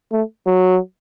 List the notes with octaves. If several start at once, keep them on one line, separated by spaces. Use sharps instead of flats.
A3
F#3